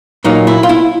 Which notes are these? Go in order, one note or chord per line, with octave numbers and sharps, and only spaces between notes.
A#2 F#3 A#3 D#4
E4
F4
E4